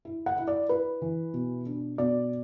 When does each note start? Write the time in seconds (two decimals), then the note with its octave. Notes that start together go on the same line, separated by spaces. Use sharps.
0.05 E4
0.26 F#5
0.37 E4
0.48 D5
0.69 E4 B4
1.02 E3
1.34 B2
1.66 D4
1.98 B2 D5